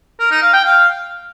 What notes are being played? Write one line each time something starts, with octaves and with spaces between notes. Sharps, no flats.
A#4
D#4
F5
G5
F5